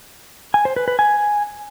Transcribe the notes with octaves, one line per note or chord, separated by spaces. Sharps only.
G#5
C5
B4
B4
G#5